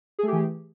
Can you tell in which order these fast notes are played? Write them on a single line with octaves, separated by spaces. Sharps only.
G#4 A3 G4 E3